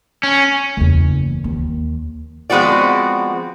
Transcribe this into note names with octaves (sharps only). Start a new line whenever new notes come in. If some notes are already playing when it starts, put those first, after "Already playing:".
C#4
F#1 E2
D#2
F3 G#3 B3 C4 F#4 D5